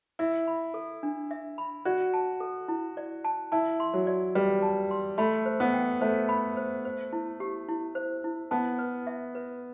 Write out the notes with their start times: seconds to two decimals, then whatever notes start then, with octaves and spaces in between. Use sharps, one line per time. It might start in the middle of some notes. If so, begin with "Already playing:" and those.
0.19 E4 E5
0.47 B5
0.74 A4
1.03 D4
1.31 E5
1.58 B5
1.85 F#4 D5
2.14 A5
2.40 A4
2.68 E4
2.97 D5
3.24 A5
3.52 E4 A5
3.80 C6
3.94 F#3
4.07 D5
4.35 G3 B4
4.62 A5
4.91 C6
5.18 A3 B5
5.46 C5
5.60 B3
5.74 G5
6.01 A3 C5
6.29 B5
6.57 C5
6.85 C5
7.13 E4
7.40 G4
7.69 E4
7.95 C5
8.24 E4
8.51 B3 A5
8.79 B4
9.07 E5
9.35 B4